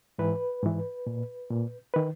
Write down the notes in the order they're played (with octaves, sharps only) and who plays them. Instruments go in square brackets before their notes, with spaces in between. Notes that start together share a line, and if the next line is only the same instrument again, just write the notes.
[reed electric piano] G#2 E3 B4
G#2 E3
A#2
A#2
D#3 B4